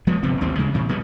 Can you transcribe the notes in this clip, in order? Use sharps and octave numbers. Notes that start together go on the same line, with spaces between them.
F3 G#3 B3
G1 C3 B3 C4
A1 D#2 G3 C4
C#3 G#3
A#2 C#3 F3
B2 G3 G#3 B3